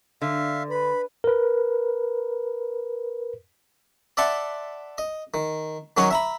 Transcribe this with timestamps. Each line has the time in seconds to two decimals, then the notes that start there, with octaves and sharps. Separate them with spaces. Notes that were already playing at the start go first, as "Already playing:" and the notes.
0.22 D3 E5 F5
0.71 B4 B5
1.24 A#4 B4
4.17 D5 E5 F#5 A5 C6
4.98 D#5
5.34 D#3
5.97 D#3 F#3 C#4 F#4 C#5 D#5
6.11 E5 A#5 B5